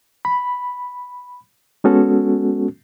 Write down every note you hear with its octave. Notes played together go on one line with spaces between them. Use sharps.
B5
G#3 B3 C#4 F#4 A4